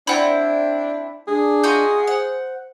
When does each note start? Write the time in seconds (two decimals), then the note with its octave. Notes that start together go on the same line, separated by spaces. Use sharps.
0.07 C4 D4 E4 D5 F#5 B5
1.28 D4 G#4
1.64 F4 F#4 D#5 G6
2.07 C5 F#5